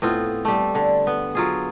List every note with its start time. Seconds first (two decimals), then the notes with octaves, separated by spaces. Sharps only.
0.02 A2 B3 C4 F4
0.45 G3 A3
0.75 D3
1.07 B3
1.35 F#3 F4 G#4